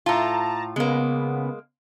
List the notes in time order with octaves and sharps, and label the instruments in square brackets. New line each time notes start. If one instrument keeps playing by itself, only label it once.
[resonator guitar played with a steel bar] A2 F4 [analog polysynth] A5 A#5
[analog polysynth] C#3 B3 [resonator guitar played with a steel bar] G#3 A#3